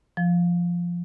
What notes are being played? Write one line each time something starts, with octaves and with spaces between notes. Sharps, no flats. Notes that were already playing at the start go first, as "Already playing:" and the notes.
F3